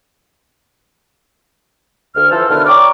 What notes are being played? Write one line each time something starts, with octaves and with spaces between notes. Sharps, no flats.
D2 F6
E3 F3 A4 C5
B2 D3 D#3 E4 B4 F6
C#5 D5 G5 A#5 C#6 D6